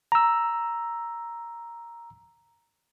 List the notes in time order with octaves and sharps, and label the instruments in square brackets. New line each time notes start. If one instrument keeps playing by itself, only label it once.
[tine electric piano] A#5 E6